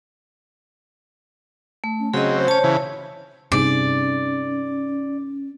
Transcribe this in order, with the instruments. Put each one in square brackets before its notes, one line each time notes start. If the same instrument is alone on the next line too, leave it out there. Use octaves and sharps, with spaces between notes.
[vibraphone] A3
[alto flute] C#4
[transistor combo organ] C#3 F#3 C4 [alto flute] C#4 [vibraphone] G#4 D#5
[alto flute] C5
[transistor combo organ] C#4 [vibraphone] C#5 A5
[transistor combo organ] C#3 E3
[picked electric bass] G2 C3 [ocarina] C#4 [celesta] D#4 G#4 [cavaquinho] D5